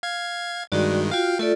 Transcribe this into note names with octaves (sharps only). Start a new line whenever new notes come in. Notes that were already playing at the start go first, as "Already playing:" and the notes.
F5 G#6
G2 D#3 G#3 F#4 D5
F4 F#4 F5 G5
A3 F4 A4 D5